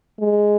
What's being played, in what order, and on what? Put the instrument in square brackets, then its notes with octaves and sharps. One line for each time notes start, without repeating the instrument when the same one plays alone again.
[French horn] G#3